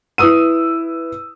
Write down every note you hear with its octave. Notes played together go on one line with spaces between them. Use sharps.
E4 B4 D#6 E6 D#7